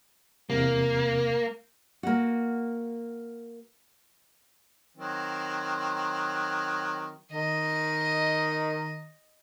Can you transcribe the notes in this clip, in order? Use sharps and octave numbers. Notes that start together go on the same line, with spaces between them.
E2 C3 A#3
A#3 F#4
D#3 F#3 C4
D#3 D#5